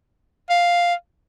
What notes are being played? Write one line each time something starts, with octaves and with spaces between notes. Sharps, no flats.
F5